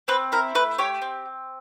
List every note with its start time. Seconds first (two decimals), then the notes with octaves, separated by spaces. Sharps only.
0.08 C4 B4
0.32 E4 A#4
0.55 A3 B4
0.78 G4 C#5
1.02 C4